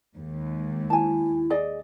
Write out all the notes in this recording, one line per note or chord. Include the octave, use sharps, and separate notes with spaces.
D#2 G#3
E4 G#5 A5
G#4 D5 D#5